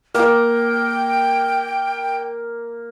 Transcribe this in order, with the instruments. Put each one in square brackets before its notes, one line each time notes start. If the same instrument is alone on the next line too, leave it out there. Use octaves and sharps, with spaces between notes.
[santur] A#3 [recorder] G5